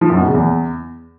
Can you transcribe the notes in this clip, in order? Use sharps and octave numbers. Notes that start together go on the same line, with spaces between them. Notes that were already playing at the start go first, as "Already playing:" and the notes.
F3
F#2
B2
C#3
E2